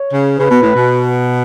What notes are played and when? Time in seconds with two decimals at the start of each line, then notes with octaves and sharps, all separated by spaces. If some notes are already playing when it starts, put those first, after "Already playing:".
Already playing: C#5
0.12 C#3
0.38 C#3 B4
0.50 B2
0.62 A2
0.74 B2